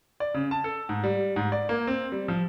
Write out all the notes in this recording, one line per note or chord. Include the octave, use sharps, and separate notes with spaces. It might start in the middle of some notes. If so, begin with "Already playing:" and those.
D5
C#3
A5
A4
G#2
G3
G#2
D5
A#3
C4
G3
F3